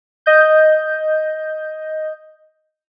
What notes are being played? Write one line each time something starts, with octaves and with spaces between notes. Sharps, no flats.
D#5 G6